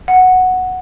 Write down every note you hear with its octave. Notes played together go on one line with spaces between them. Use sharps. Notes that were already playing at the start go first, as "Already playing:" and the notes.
F#5